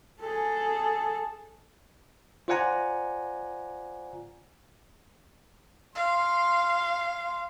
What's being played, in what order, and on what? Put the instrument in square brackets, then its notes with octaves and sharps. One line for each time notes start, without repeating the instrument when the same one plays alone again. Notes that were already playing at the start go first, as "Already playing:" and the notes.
[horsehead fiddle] G#4 A4
[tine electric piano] F4 C5 D5 F#5 G#5 A#5
[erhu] F5 [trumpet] C6